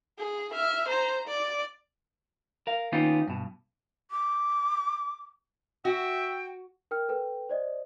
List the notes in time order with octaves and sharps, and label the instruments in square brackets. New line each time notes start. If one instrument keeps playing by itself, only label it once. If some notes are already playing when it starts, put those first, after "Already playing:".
[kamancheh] G#4
E5 F6
C5 A#5
D5
[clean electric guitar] A#4 F5
D#3 A#3 B3 C#4 D#4 F4
G2 B2
[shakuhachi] D6
[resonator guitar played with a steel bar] F#4 [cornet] E5 [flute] G5
[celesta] A#4 G5 F6
A4 B4 G5
C5 D5 D#5